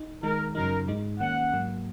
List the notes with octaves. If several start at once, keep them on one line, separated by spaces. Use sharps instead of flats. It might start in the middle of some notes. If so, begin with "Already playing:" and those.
Already playing: D#4
D#3 G#3 D#4 A#4
F#2 C#3 F#3 D#4 A#4
G#2 G#3 D#4
D#3 A#3 C#4 F#5
G#2 F#3 A#3